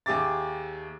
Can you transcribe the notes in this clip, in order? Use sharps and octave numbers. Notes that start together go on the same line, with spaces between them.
D#2 G4 G#4 E5 D6 A6